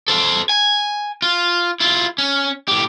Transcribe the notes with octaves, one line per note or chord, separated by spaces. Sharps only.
A4 C5
G#5
F4
E4 F4
C#4
A2 G4